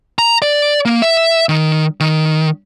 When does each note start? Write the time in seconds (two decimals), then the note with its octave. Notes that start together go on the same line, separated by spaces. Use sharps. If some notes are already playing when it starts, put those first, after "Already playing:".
0.19 A#5
0.42 D5
0.85 A#3
1.02 E5
1.49 D#3
2.00 D#3